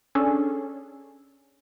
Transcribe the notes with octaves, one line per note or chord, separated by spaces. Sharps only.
C#4 D4 G#4 A4